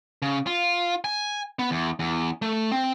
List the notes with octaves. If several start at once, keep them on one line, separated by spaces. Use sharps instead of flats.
C#3
F4
G#5
B3
E2
E2
A3
C4